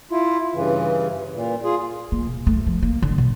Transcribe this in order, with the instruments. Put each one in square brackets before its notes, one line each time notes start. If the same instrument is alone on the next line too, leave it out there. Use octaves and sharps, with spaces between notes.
[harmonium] E4 F4
G2 C#3 E3
A#2
F4 G#4
[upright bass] A#3
B2
A3
F3
A#3
D3
B2